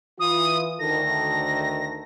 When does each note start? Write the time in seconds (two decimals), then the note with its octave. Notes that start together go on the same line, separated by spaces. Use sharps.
0.20 E3 F4 D#6
0.79 D2 D#3 A4 A#6